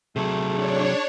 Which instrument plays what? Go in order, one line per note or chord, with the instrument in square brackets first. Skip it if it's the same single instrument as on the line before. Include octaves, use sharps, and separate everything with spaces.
[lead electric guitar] C3 F#3 [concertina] A3 [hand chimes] G#4
[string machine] D4 C#5 [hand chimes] G#4